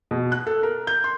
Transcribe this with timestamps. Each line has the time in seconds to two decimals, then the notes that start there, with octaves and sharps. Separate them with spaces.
0.11 B2
0.32 F#6
0.47 A4
0.63 A#4
0.87 G6
1.04 C6